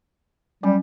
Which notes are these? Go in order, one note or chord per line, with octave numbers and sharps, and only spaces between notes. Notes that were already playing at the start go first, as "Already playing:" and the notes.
F#3 G3 C#4